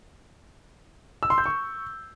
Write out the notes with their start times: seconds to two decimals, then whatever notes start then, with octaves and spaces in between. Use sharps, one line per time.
1.23 E6
1.30 C6
1.38 G6
1.46 C#6